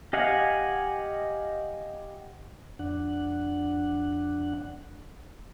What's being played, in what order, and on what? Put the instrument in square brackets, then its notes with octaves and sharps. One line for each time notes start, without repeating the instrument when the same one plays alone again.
[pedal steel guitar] G4 D#5 F5 F#5 G#5
[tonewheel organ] F2 D4 F#5